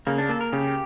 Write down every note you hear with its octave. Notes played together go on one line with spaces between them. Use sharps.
C#3 A#3
D4
A#3 A4
A#4
C#3 G4